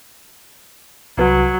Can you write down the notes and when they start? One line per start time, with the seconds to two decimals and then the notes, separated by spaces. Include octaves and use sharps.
1.17 C2 F#3 B4